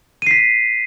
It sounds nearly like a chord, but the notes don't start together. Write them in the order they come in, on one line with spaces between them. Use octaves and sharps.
D#7 C7 B6